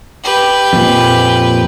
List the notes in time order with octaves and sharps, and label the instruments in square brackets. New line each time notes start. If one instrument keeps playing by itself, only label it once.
[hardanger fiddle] G4 B4
[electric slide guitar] F2 A#2